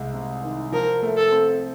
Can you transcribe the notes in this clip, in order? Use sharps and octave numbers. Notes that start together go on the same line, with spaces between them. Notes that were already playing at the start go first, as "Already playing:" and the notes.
Already playing: C2 C3 G#3
C3
D#3
F3 A#4
A3
A4
C4